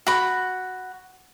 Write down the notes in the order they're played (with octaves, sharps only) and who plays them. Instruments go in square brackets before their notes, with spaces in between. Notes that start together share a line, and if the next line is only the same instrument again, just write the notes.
[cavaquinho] F#4 B5